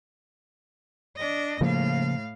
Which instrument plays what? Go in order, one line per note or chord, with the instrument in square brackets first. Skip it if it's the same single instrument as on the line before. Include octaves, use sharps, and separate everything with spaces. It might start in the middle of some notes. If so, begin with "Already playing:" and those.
[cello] D4 D#5
[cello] A2 F5 [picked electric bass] C#3 F3 A#3